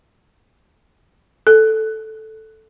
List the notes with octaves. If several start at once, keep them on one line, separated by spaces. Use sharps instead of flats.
A4